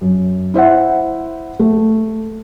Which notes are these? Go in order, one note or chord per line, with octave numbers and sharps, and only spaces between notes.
F#2
E4 C5 E5 F#5
A3